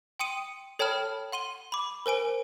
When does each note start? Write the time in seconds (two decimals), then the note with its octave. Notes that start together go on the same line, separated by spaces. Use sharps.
0.19 G5 C6 D#6 C#7 D#7
0.79 A4 C#5 G5 A5 B5 F6
1.32 F#5 C6 D#7 G7
1.72 B5 D6
2.06 A#4 C5 G#5 D7